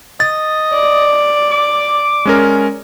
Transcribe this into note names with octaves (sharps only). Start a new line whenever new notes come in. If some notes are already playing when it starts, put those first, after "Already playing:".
D#5 A6
D5
D6
G#3 C#4 A#4